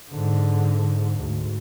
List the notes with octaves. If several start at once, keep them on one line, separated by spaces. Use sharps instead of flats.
G#2 D3
D2 G#2